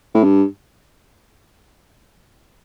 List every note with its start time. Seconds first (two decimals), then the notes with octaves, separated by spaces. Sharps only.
0.15 A2
0.24 G2